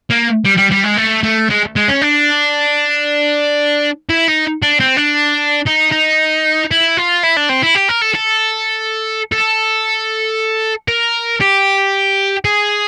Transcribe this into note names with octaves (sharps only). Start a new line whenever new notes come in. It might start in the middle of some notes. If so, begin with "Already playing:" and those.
A#3
G3
G3
G3
G#3
A3
A3
G#3
G#3
C#4
D4
E4
D#4
D4
C4
D4
D#4
D#4
E4
F4
E4
D4
C4
E4
G4
A#4
A4
A4
A4
A#4
G4
G#4